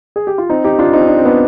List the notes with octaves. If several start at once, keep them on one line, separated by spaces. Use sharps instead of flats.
G#4
G4
F4
C4 D#4
D#4 G4
D4 F4
C4 D#4
D4
C4
B3 D4